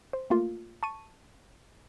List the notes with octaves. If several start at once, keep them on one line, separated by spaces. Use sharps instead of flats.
C5
A3 A#3 F4
A5 C#6 D#7